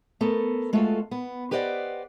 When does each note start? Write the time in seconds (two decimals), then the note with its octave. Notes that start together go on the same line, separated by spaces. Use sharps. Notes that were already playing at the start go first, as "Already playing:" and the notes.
0.21 A3 B3 A4 A#4
0.73 G#3 A3 F4 F#4 A4 F5
1.11 B3
1.51 G4 B4 C5 D5 D#5 F#5